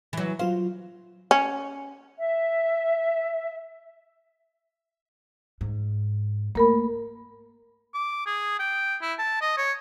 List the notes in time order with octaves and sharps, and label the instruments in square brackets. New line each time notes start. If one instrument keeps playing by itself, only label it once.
[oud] E3 F#3
[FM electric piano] F#3 F4 F5 [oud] C5
[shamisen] C#4
[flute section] E5
[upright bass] G#2
[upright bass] A3 [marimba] A#3 A#4 B5
[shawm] D6
G#4
G5
E4
A5
D#5
C#5